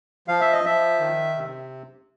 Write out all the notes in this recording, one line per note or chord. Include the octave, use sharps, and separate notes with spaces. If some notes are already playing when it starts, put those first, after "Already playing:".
F3 F5
E5
D#5
F3 E5
D#3
C3